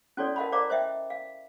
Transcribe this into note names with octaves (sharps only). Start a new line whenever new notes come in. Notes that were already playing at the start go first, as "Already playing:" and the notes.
C#4 E4 F#4 A4 C#5 D5
A#4 D#5 F5 F#5 A5 B5
A#4 C5 D5 F5 A#5 D6
C5 D#5 E5 G5
F5